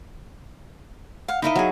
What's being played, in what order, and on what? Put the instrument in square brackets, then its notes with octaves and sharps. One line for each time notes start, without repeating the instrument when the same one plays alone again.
[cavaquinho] F5 F#5
[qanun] D#4 A#4 D#5 [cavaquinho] E4 F5 B5
[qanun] F#3 G#4